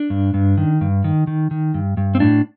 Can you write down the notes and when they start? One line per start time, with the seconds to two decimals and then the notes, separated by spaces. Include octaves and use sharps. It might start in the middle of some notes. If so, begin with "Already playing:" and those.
Already playing: D4
0.10 G2
0.34 G2
0.58 D#3
0.81 G2
1.04 D#3
1.27 D#3
1.51 D#3
1.74 G2
1.97 G2
2.15 C4
2.20 A2 D4